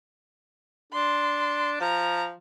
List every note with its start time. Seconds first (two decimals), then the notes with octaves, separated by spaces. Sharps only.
0.93 D4 C6
1.80 F3 A#5